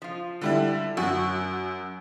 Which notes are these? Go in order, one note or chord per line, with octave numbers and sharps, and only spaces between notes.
F3 F4
D3 G3 E4
F#2 F#4